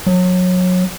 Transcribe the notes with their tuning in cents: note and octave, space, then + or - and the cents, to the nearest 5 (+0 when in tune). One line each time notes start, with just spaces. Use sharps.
F#3 -25